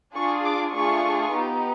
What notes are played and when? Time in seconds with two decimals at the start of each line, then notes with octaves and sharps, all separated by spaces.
0.15 D4 F4 G#4 C#6
0.45 D6
0.73 A3 D4 F4 G#4 C#6
1.33 B3 D#4 G4